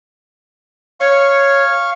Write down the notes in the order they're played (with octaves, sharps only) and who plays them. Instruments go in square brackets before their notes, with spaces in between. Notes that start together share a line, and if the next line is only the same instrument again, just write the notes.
[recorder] C#5 [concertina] F5 C#6